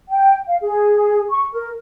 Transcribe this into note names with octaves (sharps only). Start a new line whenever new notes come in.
G5
F5
G#4
C#6
A#4